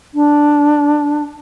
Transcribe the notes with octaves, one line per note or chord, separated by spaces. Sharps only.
D4